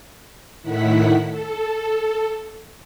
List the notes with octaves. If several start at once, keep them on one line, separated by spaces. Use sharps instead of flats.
A2 D#3 E4 F#5 B6
A4